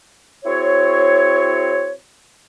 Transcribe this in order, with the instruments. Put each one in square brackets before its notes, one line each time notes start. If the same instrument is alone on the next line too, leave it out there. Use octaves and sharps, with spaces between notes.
[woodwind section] C4 E4 F#4 G#4 C#5